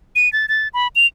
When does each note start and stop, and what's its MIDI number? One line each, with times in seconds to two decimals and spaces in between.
0.16 0.31 99
0.33 0.46 93
0.49 0.68 93
0.74 0.88 83
0.96 1.07 101